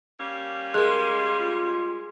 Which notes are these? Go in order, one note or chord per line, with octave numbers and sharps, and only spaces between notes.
G3 A#3 C#4
G#3 G#4 A#4 C6
F4